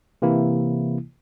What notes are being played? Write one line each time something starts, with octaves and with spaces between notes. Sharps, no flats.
C3 E3 A#3 E4